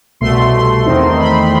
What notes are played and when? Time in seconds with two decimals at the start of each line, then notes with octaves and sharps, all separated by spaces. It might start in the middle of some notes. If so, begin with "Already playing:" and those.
0.20 C2 B2 A3 C6
0.54 C6
0.86 E2 D#3 A3 C4 D#4
1.19 B5